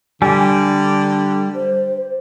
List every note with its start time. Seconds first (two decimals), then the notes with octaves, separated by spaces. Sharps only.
0.22 D3 G3 G#5
1.55 C5